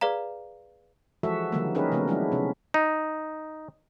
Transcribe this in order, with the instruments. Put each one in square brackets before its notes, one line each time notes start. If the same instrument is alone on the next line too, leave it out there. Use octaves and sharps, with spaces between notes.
[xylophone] G#4 B4 D5 F5 A#5
[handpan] E3 F3 G#3 F#4 A4 E5
D3 D#3 F3 G3 G#3 A#3
C#4 D#4 G4 G#4 A#4 B4
C#3 F3 A3 B3
F#3 G#3 D4 E4
C3 C#4
[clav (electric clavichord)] D#4